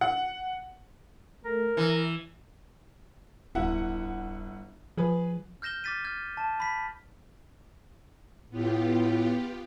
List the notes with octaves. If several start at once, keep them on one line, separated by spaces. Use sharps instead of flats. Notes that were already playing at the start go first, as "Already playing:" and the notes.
F#5
A3 A#4
E3 E4
D1 G1 E4 F#5
F3 G#4 B4
F6 G6 A#6 E7 G7
D6 F6 A6 B6 D#7
F6 G#6
A5
B5 B6
A2 B3 F4 G4